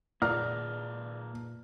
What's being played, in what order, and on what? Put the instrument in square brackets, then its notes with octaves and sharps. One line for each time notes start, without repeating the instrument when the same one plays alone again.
[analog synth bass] A#2 [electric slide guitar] A#3 G#4 B4 [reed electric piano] D5 A#5 [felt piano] F6